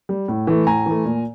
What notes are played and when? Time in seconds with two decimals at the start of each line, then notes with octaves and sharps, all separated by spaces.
0.09 G3
0.28 A2
0.47 E3 A3
0.67 A2 G#5 A#5
0.86 E3 A3
1.05 A#2